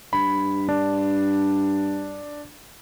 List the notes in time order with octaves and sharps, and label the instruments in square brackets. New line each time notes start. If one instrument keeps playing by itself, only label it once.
[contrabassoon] G2 [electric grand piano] B5
[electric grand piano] D4